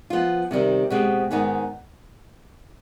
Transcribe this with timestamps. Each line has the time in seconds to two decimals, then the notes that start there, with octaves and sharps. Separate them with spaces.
0.10 F3 B3 F4
0.51 C3 D#3 G3 C4
0.90 B2 G#3 C4 G4
1.31 G#2 D#3 B3 D#4